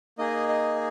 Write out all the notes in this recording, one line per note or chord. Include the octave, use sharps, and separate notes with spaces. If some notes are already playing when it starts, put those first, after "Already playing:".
A#3 D#4 G#4 D#5
D#5